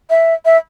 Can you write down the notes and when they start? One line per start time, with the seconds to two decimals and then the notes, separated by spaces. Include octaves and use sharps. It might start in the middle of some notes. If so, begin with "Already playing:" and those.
0.10 E5
0.45 E5